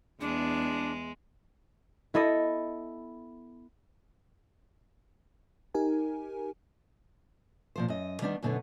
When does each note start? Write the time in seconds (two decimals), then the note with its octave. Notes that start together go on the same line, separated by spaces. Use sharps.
0.20 E2 G#3 B3 D4
2.14 B3 E4 A4 D#5
5.74 D#4 G4 A#4 G#5
7.76 A#2 F3 C5
7.88 F#2 D#5
8.21 D#3 G3 B3 D4 D#4
8.43 F#2 B2 D3 B3 D#4